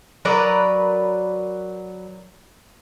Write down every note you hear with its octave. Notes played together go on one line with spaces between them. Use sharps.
F#3 A#4 B4 D5